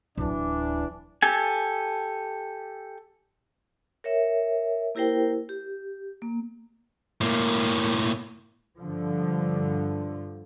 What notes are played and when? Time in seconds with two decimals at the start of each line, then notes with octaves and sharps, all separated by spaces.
0.17 D1 D2 E3 D4
1.22 G4 A4 G#5
4.04 A#4 C#5 E5
4.95 A#3 E4 G4 A#4 C5 G5
5.49 G4
6.22 A#3
7.21 A2 A#3
8.78 G2 D3 F3